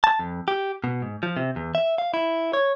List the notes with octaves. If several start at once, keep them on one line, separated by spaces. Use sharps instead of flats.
A5
F2
G4
B2
G#2
F3
C3
E2
E5
F5
E4
C#5